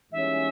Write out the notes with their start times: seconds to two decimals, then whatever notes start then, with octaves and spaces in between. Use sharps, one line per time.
0.12 G#2 E3 G3 A#3 C#4 E5